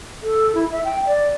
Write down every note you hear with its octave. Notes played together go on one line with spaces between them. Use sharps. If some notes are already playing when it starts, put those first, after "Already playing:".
A4
E4
E5
G5
D5